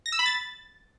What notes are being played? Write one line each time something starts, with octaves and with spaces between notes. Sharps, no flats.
A#6
E6
B5
A6